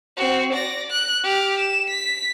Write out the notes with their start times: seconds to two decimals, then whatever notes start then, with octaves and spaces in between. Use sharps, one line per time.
0.17 C4 F#4
0.53 D5 A#6
0.91 F#6
1.23 G4 F6
1.59 E7
1.90 B6